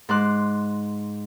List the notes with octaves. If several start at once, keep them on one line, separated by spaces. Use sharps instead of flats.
G#2 C6 D6 F#6